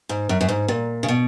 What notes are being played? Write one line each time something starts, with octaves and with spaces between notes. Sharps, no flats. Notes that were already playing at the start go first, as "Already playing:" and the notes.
G#2
F#2
F#2
G#2
A#2
C#3
B2